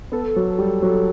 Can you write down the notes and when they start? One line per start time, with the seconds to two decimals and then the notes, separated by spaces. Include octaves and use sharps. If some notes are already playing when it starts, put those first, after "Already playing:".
0.12 B3 A4
0.36 F#3
0.59 G3
0.82 F#3